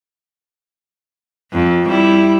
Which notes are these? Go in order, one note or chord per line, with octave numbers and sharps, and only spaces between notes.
F2
G3 E4